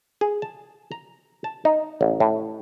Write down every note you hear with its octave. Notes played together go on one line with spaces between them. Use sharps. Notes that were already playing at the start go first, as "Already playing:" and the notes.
G#4
A5
A#5
A5
D#4
A1
A2